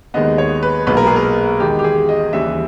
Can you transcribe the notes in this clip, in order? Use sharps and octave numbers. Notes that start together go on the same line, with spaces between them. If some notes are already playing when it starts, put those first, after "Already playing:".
D#2 D#3 G#3 B3 D#5
C#5
B4
B1 A#2 G#3 B3 B4
A#4
G#4
A#4
E2 D#3 G#3 G4
G4
G#4
D#5
D#2 C#3 E3 G3 E5